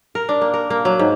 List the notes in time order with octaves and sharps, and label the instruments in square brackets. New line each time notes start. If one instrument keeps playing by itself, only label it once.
[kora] A#4
D4
A#3
A#4
A#3
F#3
G#2